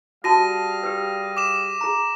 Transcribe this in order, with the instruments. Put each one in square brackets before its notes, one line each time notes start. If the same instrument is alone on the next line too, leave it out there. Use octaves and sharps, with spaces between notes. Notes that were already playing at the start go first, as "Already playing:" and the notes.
[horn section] G3 G#4 F5 [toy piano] F#4 A5 [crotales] A#6 D#7
[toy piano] G4 B4
[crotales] D6 E7
[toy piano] G#4 A#5